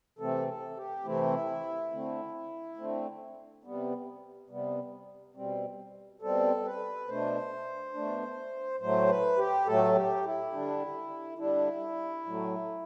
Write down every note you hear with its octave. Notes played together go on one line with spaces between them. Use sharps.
C3 E3 A3 C4 A4
A4
G4
C3 E3 A3 C4 E4
D3 A3 C4
D3 A3 C4
C3 G3 B3
C3 G3 B3
B2 G3 C4
B2 G3 C4 A4
B4
B2 A3 D4 C5
B2 A3 D4
A2 F#3 A3 C5
B4
G4
A2 F#3 A3 A4
G4
E4
D3 G3 D4
D3 G3 D4 E4
A2 F#3 A3